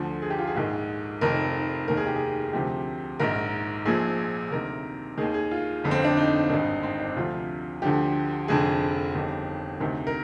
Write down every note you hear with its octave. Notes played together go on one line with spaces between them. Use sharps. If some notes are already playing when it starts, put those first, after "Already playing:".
Already playing: D2 D3 F3
G#4
G4
F4
G#4
A#1 G#2 D#3
F1 F2 D#3 A#4
F1 D#2 D#3 A#4
G#4
G4
G#4
D2 C3 F3 G4
A#1 G#2 D#3 A#4
A#1 A#2 F3 G#4
D2 C3 D#3 A#4
D#2 D#3 G#4
G#4
F4
G1 F2 D3
C4
D4
D#4
G#1 G2 D#3
C4
D4
D2 C3 F3 F4
D2 D3 F3 G4
F1 F2 D3 G#4
G1 F2 D#3 G4
D2 C3 D#3
A#4